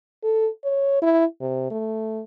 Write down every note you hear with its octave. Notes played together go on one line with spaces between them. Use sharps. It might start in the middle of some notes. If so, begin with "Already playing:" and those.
A4
C#5
E4
C3
A3